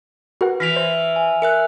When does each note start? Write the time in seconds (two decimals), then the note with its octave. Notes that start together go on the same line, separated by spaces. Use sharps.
0.41 F#4 A#4 B4 F#5
0.60 E3 F6 A#6 B6 D7 F7
0.76 C5
1.16 G#5
1.42 A#4 E5 F#6 C#7